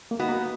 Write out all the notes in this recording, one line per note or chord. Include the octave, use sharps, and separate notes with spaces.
A#3
B3 D#4 F#4
A#3